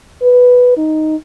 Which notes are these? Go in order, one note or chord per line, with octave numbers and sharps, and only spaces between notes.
B4
D#4